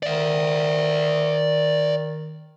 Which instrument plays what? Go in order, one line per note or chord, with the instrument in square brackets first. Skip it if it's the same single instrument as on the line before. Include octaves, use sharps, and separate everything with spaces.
[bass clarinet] D#3 [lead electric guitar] D5 E5